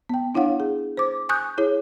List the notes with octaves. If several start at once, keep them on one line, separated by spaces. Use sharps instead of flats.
B3 G5
D4 E4 C#5 F5 F#5
G#4
C5 D6
G#5 C#6 D#6 F#6 G6
E4 G#4 C#5